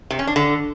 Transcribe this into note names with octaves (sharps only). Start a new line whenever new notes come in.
C3
C#4
D4
D3